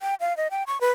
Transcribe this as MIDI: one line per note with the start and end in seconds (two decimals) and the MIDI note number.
0.01 0.15 79
0.20 0.36 77
0.37 0.48 75
0.51 0.63 79
0.67 0.80 85
0.81 0.91 71